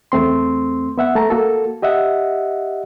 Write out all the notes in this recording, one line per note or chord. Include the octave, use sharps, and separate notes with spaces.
E2 A3 C4 C6
B3 E5 F#5
A3 A5 A#5
A#3 F#4 A4
G4 D#5 E5 F#5